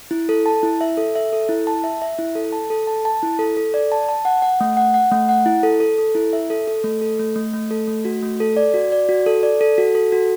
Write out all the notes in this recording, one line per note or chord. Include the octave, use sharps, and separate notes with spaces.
E4
A4
A5
E4
E5
A4
E5
A4
E4
A5
E5
E5
E4
A4
A5
A4
A5
A5
E4
A4
A4
D5
A5
A5
F#5
F#5
A3
F#5
F#5
A3
F#5
E4
A4
A4
A4
E4
E5
A4
A4
A3
A4
A3
A3
A3
A4
A3
F#4
A3
A4
D5
F#4
D5
F#4
A4
D5
A4
F#4
A4
F#4